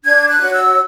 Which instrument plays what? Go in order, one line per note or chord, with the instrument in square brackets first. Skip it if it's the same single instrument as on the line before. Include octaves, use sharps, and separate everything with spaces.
[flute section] D4 G#6
F#6
F#4 C#5
E6